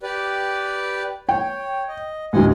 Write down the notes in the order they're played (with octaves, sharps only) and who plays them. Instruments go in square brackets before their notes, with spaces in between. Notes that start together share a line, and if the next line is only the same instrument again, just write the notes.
[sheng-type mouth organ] G4 B4 D5
[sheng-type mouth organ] C#5 [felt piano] G5
[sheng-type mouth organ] D#5
[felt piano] A1 D2 [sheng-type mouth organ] D#5 F#5 G#5